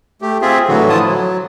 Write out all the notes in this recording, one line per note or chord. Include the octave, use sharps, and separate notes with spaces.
A3 G4
C4 F4 G#4 E5
A2 D3 E3 F#3 F#4
E3 F3 E4 F4 A5 D#6
F#3